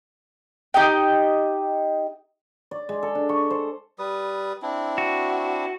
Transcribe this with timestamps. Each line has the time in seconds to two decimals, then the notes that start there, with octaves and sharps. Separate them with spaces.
0.74 D#4 G4 D#5 G5
2.71 D5
2.89 G#3
3.03 A4
3.15 D4
3.29 C#6
3.50 C5
3.99 G3 B4 D#6
4.62 C4 D4 E4
4.98 F#4